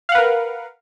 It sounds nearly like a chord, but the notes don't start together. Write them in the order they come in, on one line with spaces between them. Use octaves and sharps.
F5 F#5 B4 A#4